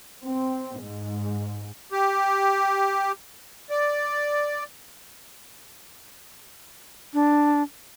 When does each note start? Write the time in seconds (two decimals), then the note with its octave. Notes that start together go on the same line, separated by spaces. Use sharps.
0.23 C4
0.80 G#2
1.92 G4
3.70 D5
7.14 D4